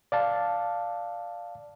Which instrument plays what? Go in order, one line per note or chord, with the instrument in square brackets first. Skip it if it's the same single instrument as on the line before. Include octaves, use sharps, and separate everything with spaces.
[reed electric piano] D5 F5 A5